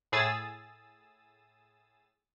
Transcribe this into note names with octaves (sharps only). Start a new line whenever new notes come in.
A2 G#4 D#6 E6 A6